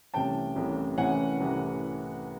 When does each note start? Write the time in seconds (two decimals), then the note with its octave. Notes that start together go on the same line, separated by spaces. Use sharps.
0.14 C2 C3 E3 A3 C#4 G5 A5
0.56 C2 C3 E3 A3 C#4
0.98 C2 C3 E3 A3 C#4 F#5 G#5
1.40 C2 C3 E3 A3 C#4